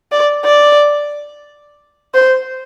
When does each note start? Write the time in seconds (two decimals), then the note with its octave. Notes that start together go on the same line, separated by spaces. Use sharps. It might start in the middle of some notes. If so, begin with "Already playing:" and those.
0.12 D5
0.45 D5
2.14 C5